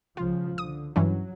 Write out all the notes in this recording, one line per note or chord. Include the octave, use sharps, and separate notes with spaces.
C#2 C#3 F3 F4
D3 D#6
G2 E3 F#3 C#4